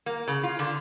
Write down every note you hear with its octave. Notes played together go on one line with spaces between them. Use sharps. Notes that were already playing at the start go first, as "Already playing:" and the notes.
A#3
C#3
F4
D3